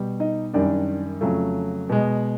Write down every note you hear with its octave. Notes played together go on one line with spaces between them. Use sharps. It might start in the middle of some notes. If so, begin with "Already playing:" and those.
Already playing: B2 G3
D#4 D#5
F#2 D#3 G3 D4 D5
F2 C#3 F#3 A3
B2 G#3